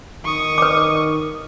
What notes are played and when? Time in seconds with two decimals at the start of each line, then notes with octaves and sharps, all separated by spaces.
0.24 D#3 C#6 D#6
0.58 B4 D6